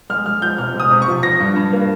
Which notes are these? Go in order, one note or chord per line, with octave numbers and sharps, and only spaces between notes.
G#3 F6
G#3 F6
F3 G6
C3 F6
G#3
D#6
C3
C#6
F3
F3 A#6
G2
G2
A#3